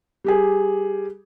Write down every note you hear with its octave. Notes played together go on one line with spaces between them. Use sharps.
G3 G4 G#4